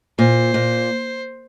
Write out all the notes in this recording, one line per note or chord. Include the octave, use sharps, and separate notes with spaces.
A#2 C5
A#2